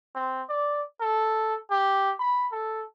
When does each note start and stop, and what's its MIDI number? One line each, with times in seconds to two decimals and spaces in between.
0.15 0.42 60
0.49 0.82 74
1.01 1.57 69
1.71 2.13 67
2.20 2.47 83
2.52 2.83 69